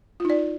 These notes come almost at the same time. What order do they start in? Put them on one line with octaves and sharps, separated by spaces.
F4 D#4 D5